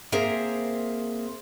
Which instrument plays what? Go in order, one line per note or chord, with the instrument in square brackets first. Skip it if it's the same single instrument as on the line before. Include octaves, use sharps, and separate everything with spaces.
[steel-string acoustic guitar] A#3 C4 G#4 A#4 C5 E5